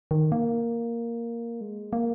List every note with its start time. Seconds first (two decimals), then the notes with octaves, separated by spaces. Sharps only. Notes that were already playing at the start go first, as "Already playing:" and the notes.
0.11 D#3
0.32 A#3
1.61 G#3
1.93 A#3